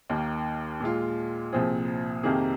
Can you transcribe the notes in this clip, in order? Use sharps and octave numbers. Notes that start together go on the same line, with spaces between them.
D#2 D#3 A#3
A#2 G#3 F4
C2 A#2 F3 C4 G#4
F2 C3 D#3 A#3 G#4